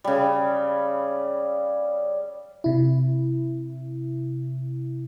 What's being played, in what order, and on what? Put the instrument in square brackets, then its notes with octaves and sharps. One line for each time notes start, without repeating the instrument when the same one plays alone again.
[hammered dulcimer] C#3 G3
[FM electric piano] C3 E4